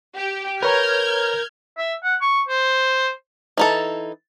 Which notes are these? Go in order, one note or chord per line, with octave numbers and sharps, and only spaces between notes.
G4
A#4 B4 C#5 A#5 F6 G6 G#6
E5
F#5
C#6
C5
E3 D#4 A4